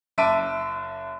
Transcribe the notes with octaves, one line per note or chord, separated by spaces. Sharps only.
F#1 E5 A5 D6 D7 D#7